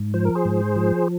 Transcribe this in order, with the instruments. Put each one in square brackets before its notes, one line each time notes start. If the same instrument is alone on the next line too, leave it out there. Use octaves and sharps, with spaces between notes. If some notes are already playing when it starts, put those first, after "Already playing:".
Already playing: [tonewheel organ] G#2
F3 C5
A#4
G#4 C5
G#2
F3